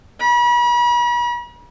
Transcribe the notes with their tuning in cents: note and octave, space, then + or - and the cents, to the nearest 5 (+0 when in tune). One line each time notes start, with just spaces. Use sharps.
B5 -40